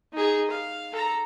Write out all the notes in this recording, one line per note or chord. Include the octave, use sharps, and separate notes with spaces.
D#4 G#4
F5
A4 A#5